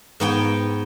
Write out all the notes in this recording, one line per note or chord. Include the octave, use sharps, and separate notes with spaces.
G#2 B3 G5